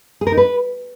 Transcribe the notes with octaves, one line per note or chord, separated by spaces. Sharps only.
G#4
A#4
D#4
B4